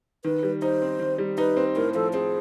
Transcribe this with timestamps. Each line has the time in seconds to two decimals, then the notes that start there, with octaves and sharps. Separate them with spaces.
0.24 D#3 B4
0.43 G3
0.62 D#4 C5
0.82 C4
1.00 D#3
1.18 G3
1.38 D#4 B4
1.57 C4
1.76 A2 A#4
1.95 F3 A4
2.14 C4 G#4